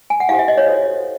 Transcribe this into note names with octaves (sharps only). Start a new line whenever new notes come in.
G#5
F#5
E4 G4 C5 F5
E5
D#5
C#5
F#4 A4 C5